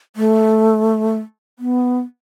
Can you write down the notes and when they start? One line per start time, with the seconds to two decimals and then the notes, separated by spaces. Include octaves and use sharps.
0.16 A3
1.59 B3